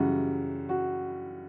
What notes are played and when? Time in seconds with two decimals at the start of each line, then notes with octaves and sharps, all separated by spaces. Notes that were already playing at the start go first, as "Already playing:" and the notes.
Already playing: F#2 C#3 E3 G3 F#4
0.69 F#4